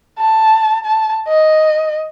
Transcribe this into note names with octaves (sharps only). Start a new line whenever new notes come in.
A5
A5
D#5